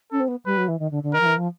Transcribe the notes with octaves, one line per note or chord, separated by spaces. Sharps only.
C#4 A4
C4
B3
G3 B4
F#3
E3
D#3
D3
D3
D#3 A#4
F3
E3
F3